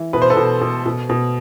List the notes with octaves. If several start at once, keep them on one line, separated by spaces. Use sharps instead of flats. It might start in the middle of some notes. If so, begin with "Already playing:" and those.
Already playing: E3
B2 B4
C5
A4 B4
B2
B2
B2
B2